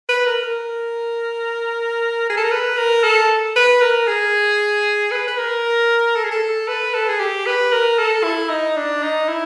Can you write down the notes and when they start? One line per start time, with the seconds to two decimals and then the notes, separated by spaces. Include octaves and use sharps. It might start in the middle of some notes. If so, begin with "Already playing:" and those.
0.09 B4
0.26 A#4
0.43 A#4
2.29 G#4
2.37 A4
2.44 A#4
2.51 B4
2.78 A#4
3.03 A4
3.56 B4
3.81 A#4
4.08 G#4
5.12 B4
5.28 B4
5.38 A#4
6.16 A4
6.24 G#4
6.32 A4
6.68 B4
6.94 A4
7.08 G#4
7.19 G4
7.46 B4
7.72 A#4
7.98 A4
8.24 E4
8.49 D#4
8.76 D4
9.03 D#4
9.29 E4